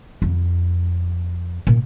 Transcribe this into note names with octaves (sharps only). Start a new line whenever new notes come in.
F2
A#2